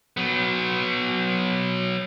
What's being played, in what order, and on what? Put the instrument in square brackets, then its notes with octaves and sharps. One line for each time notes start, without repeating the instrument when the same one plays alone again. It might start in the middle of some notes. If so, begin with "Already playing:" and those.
[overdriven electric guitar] F#3 B3